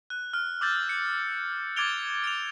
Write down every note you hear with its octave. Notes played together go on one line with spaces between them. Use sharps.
F#6
F6
D6 E6 G6 A6
C#7
D6 G#6 A6 D7 F7 G7
D7 F7